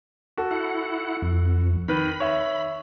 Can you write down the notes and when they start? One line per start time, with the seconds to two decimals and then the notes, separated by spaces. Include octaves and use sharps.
0.37 F#4 A4
0.51 E4 F#5
1.22 F2
1.88 D#3 B4 B5
2.20 C#5 E5